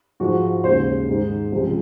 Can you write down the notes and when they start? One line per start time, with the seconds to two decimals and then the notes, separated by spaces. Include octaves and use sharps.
0.20 G#2 F3 G#3 F#4
0.64 D#2 C#3 G#3 C5
1.08 G#2 D#3 G#3
1.52 C#2 C3 F3 G#3